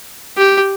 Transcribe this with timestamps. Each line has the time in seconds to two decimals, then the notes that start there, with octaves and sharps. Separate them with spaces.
0.37 G4